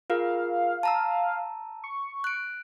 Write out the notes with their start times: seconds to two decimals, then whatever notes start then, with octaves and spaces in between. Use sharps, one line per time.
0.10 F4 G#4 A#4 F5
0.83 A5 A#5 E6
1.84 C#6
2.24 F#6 D7